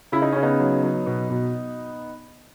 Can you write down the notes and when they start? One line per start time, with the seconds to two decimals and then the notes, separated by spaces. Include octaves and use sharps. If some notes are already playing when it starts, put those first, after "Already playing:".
0.12 C#3 E4
0.22 D#4
0.32 C#3 C#4
0.42 B3 D#4
0.60 F#3
0.83 F#3
1.06 B2
1.30 B2